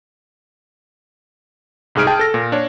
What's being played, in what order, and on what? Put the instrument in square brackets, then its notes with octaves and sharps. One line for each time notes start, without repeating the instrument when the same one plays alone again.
[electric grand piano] C2 G#2 G#4 F6 D7
G#4 G5 A5
A4 A#6
A#2
D4 C#5